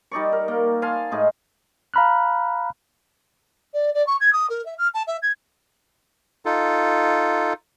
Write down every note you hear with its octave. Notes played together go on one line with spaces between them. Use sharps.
G3 D#4 D5 C#6
A#4
A#3
F5 G#5 A5 C6
A2 G#3 D#4 G#4
F5 A#5 B5 F6 F#6
D5
D5
C#6
G#6
D#6
A#4
E5
F6
A5
E5
G#6
D#4 F4 A4